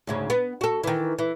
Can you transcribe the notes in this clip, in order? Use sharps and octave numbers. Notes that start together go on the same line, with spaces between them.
D2 G#2 C#3
B3
F#4 A4
D#3 E3
E3